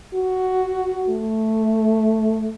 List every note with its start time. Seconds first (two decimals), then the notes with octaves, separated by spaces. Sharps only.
0.14 F#4
1.09 A3